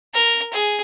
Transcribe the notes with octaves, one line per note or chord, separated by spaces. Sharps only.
A#4
G#4